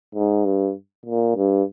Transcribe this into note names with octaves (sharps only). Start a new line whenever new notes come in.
G#2
G2
A#2
G2